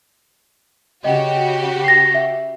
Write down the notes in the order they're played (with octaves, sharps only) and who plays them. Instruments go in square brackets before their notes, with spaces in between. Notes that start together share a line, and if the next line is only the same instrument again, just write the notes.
[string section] C#3 F#4 G4 [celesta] D#5
[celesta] A#6 C7
E5